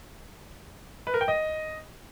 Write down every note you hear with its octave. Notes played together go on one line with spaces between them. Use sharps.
B4
A#4
G5
D#5